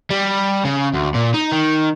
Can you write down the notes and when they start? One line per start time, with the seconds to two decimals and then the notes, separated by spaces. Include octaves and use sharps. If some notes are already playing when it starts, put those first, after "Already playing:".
0.10 G3
0.65 C#3
0.94 D2
1.15 A#2
1.34 D#4
1.52 D#3